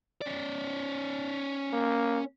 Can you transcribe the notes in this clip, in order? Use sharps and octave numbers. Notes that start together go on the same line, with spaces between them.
C#4 D5
A#3